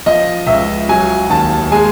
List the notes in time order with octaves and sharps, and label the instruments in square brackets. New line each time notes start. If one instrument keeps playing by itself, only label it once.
[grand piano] F3 D#5
C#2 E5
F#3 G#5
D#2 A5
G#3 G#5